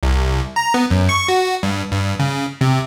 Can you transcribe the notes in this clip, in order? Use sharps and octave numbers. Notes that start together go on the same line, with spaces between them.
C2
A#5
B3
F#2
C#6
F#4
G2
G2
C#3
C3